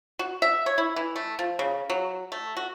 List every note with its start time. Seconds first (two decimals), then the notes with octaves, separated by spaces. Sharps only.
0.19 F#4
0.42 E5
0.66 C#5
0.78 E4
0.96 E3
1.16 A3
1.39 F3
1.59 C#3
1.90 F#3
2.32 A3
2.57 F#4